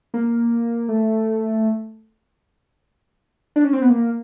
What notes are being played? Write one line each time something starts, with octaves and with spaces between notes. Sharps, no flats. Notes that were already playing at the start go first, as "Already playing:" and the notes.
A#3
A3
D4
C#4
C4
B3
A#3